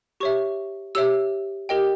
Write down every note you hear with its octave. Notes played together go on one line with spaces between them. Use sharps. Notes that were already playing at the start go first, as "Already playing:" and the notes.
G4 C#5 E5 C#6
G4 C#5 E5 E6
G4 A#4 D#5 G5